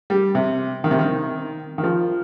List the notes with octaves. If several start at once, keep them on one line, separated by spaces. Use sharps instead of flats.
G3
C3
D#3
C3
D#3
D#3
F3